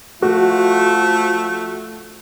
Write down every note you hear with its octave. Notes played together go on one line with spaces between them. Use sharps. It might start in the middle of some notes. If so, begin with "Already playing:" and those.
F3 A3 F4 F#4